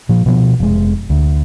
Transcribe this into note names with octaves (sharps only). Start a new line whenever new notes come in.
A#2 F3
B2 F3 B3
F1 G#3
D2